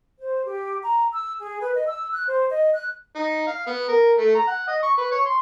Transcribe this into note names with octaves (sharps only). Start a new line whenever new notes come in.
C5
G4
A#5
E6
G#4
B4
D#5
E6
F#6
C5
D#5
F#6
D#4
F5
B3
A#4
A3
A#5
F#5
D#5
C#6
B4
C#5
C6